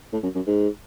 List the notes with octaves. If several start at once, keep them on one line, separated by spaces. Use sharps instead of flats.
A2
F#2
F#2
G#2